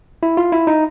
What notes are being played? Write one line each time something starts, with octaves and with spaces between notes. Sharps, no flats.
E4
F4
E4
D#4